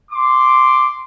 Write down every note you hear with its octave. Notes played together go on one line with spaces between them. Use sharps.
C6 D6